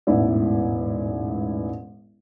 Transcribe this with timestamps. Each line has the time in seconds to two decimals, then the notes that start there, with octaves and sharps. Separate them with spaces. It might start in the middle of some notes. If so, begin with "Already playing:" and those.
0.07 E1 A1 G#2 B3 E4 D5